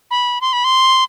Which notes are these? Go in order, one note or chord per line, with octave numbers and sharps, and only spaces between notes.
B5
C6
B5
C6